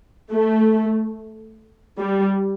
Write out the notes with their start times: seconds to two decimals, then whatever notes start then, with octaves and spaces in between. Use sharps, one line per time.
0.32 A3
2.00 G3